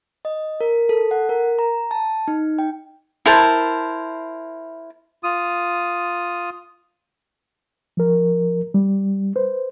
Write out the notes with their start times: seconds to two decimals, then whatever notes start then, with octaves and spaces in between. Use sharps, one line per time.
0.25 D#5
0.61 A#4
0.89 A4
1.11 F#5
1.29 A#4
1.59 A#5
1.91 A5
2.28 D#4
2.59 G5
3.26 E4 A#4 C5 A5
5.23 F4 D#6
7.97 F3 A#4
8.74 G3
9.36 B4 C5